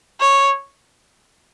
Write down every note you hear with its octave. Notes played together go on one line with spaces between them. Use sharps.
C#5